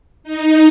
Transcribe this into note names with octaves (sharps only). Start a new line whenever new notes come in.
D#4